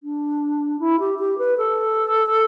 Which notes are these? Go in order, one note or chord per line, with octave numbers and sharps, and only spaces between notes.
D4
E4
G4
G4
B4
A4